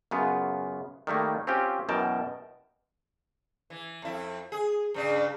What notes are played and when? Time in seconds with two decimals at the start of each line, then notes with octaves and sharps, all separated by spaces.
0.11 F#2 C#3 B3 F4
1.07 D#3 G3 A3 A#3
1.47 C4 C#4 F4 G4
1.89 F#2 B2 E3 A#4 G5 A5
3.70 E3
4.02 F2 E4
4.52 G#4
4.94 G2 C#3 D4